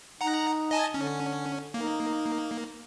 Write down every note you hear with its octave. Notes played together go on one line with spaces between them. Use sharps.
D#4 F#5 A#5
D#5 G#5 A5
D3 C#4
A#3 D#4